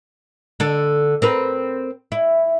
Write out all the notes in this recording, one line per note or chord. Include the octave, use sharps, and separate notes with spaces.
D3 A4
C4 A#4 B4
E4